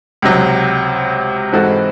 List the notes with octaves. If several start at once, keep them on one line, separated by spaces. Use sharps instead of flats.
C#2 C3 F#3
G#2 E3 C4 F#4 A4